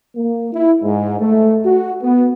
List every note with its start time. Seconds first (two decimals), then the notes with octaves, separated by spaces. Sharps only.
0.16 A#3
0.53 E4
0.83 G#2
1.19 A3
1.66 F#4
2.03 B3